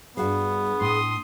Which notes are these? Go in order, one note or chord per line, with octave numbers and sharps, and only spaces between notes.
G2 B3 F#4 G#4 F5
A2 C6 D#6